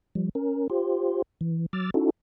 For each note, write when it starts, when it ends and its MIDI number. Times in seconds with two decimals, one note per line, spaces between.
0.15 0.29 53
0.15 0.29 55
0.35 0.68 61
0.35 0.68 70
0.70 1.22 65
0.70 1.22 67
0.70 1.22 72
1.41 1.66 52
1.73 1.90 54
1.73 1.90 86
1.73 1.90 88
1.73 1.90 89
1.73 1.90 93
1.94 2.10 61
1.94 2.10 63
1.94 2.10 64
1.94 2.10 66
1.94 2.10 69